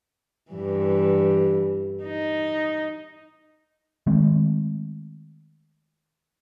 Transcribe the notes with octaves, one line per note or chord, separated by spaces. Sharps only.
G2 E3
D#4
D#3 G#3 A3 C4